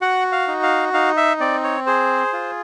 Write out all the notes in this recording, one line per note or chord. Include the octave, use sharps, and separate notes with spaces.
F#4 F#5
F5
D#4
F5
D#4 F5
E5
C4 D5
C#5
G#4 C5
F4